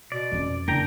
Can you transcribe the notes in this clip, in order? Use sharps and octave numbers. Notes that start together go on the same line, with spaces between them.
B2 D5
F2 C#4
F#1 D4 A#4 G5 A#5